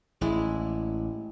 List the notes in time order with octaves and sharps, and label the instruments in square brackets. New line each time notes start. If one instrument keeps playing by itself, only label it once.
[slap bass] A1 [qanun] G#3 E4 D5